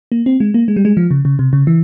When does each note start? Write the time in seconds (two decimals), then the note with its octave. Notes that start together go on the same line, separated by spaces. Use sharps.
0.12 A#3
0.26 C4
0.40 G#3
0.54 A#3
0.68 G#3
0.76 G3
0.85 G#3
0.97 F3
1.11 C#3
1.25 C#3
1.39 C3
1.53 C#3
1.67 E3